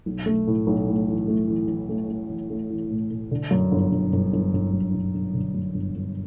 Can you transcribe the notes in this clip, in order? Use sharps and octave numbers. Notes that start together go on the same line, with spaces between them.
B1
A3
A2
B1
A2
E3
A3
E3
E3
A3
A3
E3
A3
E3
A2
A2
D3
F#2
G1
G1
G1
G1
G1
F#2
G1
G1
D3
F#2
G1
G1